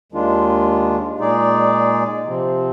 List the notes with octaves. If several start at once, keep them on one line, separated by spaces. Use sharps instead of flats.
D#2 D#3 G#3 D4 F4
A#2 G#3 D#4 G#4 D5
C3 F3 C4